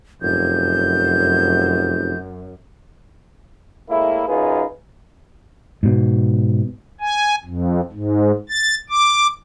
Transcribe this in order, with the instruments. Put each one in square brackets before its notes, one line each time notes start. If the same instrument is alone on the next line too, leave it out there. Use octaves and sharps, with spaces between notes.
[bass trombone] F1 [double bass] F#2 [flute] G6
[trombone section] A2 G#3 A#3 E4
F#2 D#4 F4 G#4 B4
[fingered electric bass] G#2 B2
[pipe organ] G#5
F2
G#2
A6
D6